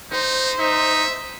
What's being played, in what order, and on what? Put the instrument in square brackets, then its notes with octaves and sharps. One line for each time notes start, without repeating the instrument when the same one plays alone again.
[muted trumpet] D#4 [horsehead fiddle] C5
[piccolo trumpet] D#4 [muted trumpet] E5